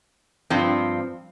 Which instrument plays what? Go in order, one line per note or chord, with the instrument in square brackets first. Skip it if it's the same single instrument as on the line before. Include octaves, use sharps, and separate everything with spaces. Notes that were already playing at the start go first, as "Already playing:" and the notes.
[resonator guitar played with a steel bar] G2 F3 C4